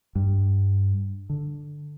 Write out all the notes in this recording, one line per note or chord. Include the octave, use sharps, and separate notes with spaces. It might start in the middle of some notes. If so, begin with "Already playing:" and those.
G2
D3